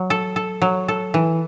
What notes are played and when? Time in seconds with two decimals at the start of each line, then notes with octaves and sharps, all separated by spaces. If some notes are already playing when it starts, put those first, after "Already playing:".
Already playing: F#3
0.10 A4
0.36 A4
0.62 F#3
0.88 A4
1.14 E3